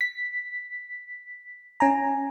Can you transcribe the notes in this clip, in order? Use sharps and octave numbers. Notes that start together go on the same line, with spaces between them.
B6
C#4 G#5 A#5